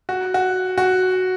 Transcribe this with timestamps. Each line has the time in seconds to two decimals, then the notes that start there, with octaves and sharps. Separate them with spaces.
0.09 F#4
0.34 F#4
0.78 F#4